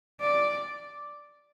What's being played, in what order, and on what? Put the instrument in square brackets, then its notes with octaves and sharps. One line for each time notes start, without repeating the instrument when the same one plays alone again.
[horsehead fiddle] D5